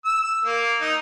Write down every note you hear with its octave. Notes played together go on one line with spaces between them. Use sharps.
E6
A#3
D#4